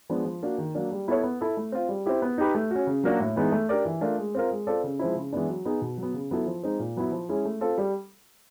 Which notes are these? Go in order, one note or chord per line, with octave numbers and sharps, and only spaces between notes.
F3 G#3 B3 D4
F3
A#3 D4 F#4
D#3
F#3 A#3 D4
G3
B3 E4 A4 C#5
B3
E4 A4
A3
C4 F4
G3
C4 E4 G4
B3
D#4 G4 B4
A3
C#4 F#4
C#3
F#3 A#3 D4 F#4
A2
E3 G#3 B3 D#4
A3
D4 G4 A#4 D5
E3
A3 D4 F4 A#4
G#3
C4 F4 A#4
G#3
C4 F4 A4 D5
C#3
F3 G#3 C4 E4
C#3
E3 G#3 B3 D4
F#3
B3 D#4 G#4
B2
F#3
B3
C#3
F#3 B3 E4 A4
F3
G#3 C4 D#4
A#2
F#3 B3 E4
F3
G#3 C#4 E4 G#4
A3
C4 F4 A4
G3